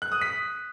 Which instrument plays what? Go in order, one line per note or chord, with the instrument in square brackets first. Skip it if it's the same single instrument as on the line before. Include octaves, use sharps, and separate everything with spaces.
[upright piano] F#6
D#6
B6